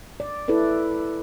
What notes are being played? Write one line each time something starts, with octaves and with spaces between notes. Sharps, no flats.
D5
E4 A4 B4 D5